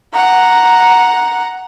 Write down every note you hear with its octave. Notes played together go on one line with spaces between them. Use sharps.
F#5 A#5